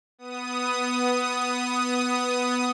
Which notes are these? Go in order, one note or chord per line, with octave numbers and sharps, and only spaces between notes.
B3 D#6